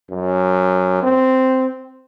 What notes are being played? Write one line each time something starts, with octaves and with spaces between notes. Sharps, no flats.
F#2
C4